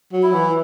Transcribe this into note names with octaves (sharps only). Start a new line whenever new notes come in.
F#3
E4
E3